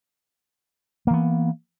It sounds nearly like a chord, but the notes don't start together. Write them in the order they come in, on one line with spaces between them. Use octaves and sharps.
A#3 E3 B3